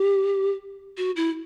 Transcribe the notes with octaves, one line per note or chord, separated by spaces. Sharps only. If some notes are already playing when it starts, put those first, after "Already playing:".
Already playing: G4
F#4
E4